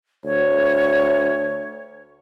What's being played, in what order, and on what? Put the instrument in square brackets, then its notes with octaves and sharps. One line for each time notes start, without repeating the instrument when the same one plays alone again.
[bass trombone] D2 [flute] C#5